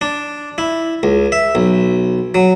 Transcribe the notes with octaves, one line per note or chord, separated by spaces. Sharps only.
D4
E4
C#2
E5
B1
F#3